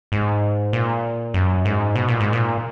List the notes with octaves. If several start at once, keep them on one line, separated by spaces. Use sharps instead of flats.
G#2
A#2
F#2
G#2
B2
A#2
G#2
A#2